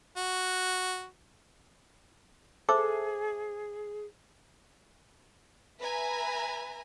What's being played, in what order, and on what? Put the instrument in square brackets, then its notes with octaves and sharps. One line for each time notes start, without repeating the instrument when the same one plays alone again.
[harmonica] F#4
[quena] G#4 [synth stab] A4 [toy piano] C5 E5 D6
[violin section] B4 E5 G#5 A#5